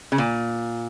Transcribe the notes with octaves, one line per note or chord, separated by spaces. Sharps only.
C#3
A#2